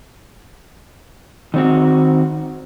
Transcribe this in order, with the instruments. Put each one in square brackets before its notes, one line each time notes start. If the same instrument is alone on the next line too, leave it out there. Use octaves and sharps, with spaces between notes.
[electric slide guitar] D#3 C4 F#4